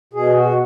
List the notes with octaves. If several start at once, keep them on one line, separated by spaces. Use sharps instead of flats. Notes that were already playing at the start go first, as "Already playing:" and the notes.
B2 G#4
F#4